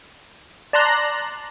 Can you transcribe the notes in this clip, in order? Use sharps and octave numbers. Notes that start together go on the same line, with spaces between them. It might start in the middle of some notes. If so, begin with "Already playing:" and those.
D5 A5 A#5 C6 F#6 A#6